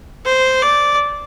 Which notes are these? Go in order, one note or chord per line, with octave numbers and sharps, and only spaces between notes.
C5
D5